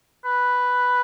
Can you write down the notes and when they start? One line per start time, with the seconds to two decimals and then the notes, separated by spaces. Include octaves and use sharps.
0.25 B4